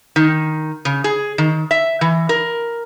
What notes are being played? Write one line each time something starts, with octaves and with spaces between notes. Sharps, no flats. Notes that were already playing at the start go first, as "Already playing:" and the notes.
D#3
C#3
G#4
D#3
E5
E3
A#4